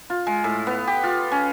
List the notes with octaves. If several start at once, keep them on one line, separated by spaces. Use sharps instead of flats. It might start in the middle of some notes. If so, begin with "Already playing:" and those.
F4
G#3
A2
B3
G4
F4
C#4